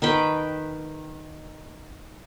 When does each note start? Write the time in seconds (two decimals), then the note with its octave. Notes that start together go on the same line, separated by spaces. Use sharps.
0.02 D#3 B4 G5